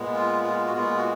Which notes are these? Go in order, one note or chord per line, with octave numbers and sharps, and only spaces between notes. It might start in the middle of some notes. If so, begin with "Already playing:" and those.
Already playing: A#2 G#3 B3
F4
F4
F#4
A#2 G#3 B3 F4
F#4